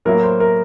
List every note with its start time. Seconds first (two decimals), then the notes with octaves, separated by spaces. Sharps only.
0.05 A2 F#3 A#3 A#4
0.23 C5
0.40 A#4